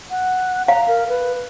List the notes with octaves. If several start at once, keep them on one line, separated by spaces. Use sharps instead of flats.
F#5
F5 A#5
A#4
B4